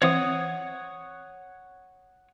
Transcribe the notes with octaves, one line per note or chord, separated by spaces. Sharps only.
E3 C4 C5 C#5 F#5 D#6